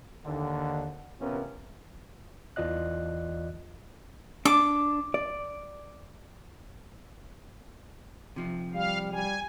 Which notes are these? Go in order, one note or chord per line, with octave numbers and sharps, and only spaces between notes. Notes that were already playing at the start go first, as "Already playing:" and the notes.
D#2 D3
A1 C3 B3 C#4 F4 A#4
E2 E3 F4 D5 D#5 F#6
D4 D6
D5
C3 F3
G3 F5
G3 G#5